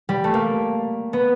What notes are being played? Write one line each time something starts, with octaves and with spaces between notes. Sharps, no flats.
G3
A3
A#3
B3